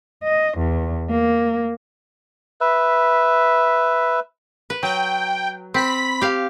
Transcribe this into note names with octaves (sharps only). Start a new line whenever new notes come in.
D#5
E2
A#3
B4 E5
B4
F#3 G5
C4 B5 B6
G4 F5